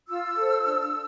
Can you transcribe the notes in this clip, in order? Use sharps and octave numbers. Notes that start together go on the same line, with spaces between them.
F4 E6
A4 C5
D4